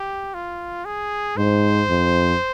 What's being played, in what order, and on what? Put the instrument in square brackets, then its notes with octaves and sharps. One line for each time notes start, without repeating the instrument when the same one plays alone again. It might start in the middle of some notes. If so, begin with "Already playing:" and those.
Already playing: [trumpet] G4
F4
G#4
[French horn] G#2 [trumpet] C5
[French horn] F2